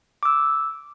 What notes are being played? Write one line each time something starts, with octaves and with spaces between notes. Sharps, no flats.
D6 E6